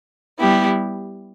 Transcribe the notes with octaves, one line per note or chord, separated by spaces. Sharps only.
G3 B3 E4 G4